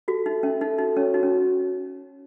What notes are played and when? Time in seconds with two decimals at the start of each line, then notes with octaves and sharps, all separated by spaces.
0.08 F#4 A4
0.26 D#4 E5
0.43 C#4 E5
0.61 D#4 A4
0.78 D#4 F#4
0.97 C#4 C#5
1.14 D#4 F#4
1.23 C#4